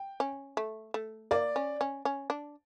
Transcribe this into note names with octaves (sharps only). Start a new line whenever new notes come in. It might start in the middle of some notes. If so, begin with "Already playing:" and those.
Already playing: G5
C#4
A3
A3
A#3 D5
C#4
C#4
C#4
D4